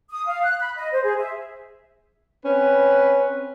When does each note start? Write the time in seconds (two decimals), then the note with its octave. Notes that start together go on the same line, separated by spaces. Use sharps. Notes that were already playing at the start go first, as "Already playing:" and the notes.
0.10 D#6
0.26 F5
0.43 F#6
0.60 B5
0.77 D#5
0.92 C5
1.04 G#4
1.19 E5
2.45 C4 C#4 B4